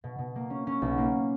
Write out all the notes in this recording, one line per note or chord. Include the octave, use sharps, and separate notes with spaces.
B2
B2
A#3
C#4
C#4
B1
A#3